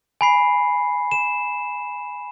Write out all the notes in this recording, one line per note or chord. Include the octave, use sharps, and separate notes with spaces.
G#5 B5 C7
E7